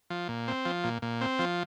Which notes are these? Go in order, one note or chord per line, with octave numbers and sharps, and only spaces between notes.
F3
A#2
C4
F3
A#2
A#2
C4
F3